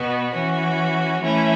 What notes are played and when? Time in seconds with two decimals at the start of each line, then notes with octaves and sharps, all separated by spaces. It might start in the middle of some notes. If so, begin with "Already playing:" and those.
Already playing: B2 B3 F#4
0.31 E3 C#4 F#4
1.21 E3 A3 C#4 E4